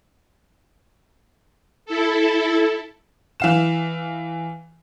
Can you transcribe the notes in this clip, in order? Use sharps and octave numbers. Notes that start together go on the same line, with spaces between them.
E4 A4
E3 F5 E7